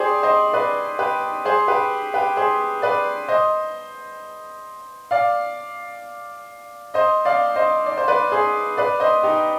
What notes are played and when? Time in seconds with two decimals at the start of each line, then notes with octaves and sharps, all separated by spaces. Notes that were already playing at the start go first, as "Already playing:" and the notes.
Already playing: G4 G#4 C5 D5
0.23 C5 D#5
0.53 B4 D5
0.99 G4 B4
1.45 G#4 C5
1.68 G4 B4
2.14 G4 B4
2.37 G#4 C5
2.82 B4 D5
3.28 C5 D#5
5.11 D5 F5
6.94 C5 D#5
7.25 D5 F5
7.56 C5 D#5
7.86 D5
7.98 C5
8.08 B4 D5
8.32 G#4 C5
8.77 B4 D5
9.00 C5 D#5
9.23 D#4 G4